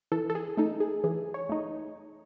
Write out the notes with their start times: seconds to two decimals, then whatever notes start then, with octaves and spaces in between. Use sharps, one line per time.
0.12 E3 A4
0.30 A4
0.35 G#4
0.57 A3 D#4 A4
0.80 G#4
1.04 E3 G#4
1.34 C#5
1.49 A3 D#4